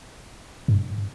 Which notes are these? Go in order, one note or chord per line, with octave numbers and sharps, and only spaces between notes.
G2